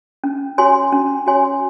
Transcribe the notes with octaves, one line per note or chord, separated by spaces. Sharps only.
C#4
F#4 C#5 G#5 C6
C#4
F#4 C#5 G#5 C6